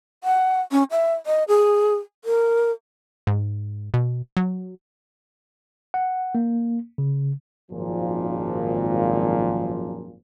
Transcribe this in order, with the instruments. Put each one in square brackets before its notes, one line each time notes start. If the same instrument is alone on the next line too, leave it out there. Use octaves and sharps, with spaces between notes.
[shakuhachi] F#5
C#4
E5
D#5
G#4
A#4
[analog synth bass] G#2
B2
F#3
[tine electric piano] F#5
A#3
C#3
[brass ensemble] G#1 F#2 A#2 F3